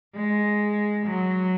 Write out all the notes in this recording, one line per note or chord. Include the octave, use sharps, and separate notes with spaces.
G#3
F#3